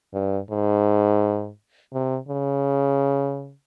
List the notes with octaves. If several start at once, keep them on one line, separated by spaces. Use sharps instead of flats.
G2
G#2
C3
C#3